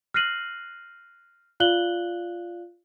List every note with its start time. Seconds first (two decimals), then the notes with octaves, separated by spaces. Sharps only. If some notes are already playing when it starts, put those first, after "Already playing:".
0.14 F6 F#6 A#6 C7 D#7 F#7
1.60 F4 D5 F5 F#6 F#7 G7